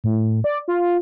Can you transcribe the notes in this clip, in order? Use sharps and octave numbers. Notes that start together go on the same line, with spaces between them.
A2
D5
F4